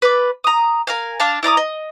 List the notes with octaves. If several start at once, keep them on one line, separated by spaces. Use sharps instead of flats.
B4 D5
A#5 D#6
A#4 F5 G#5
D4 F5 A5
E4 D5 A#5 D#6
D#5